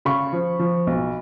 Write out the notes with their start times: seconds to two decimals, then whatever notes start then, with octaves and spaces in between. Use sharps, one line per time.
0.05 C#3 B5 C#6
0.32 F3
0.59 F3
0.87 B1